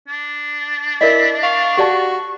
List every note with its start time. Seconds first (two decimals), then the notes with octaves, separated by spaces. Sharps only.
0.08 D4
1.01 E4 A#4 D5 D#5 B6
1.43 F5 C#6
1.77 F#4 G4 D5 A5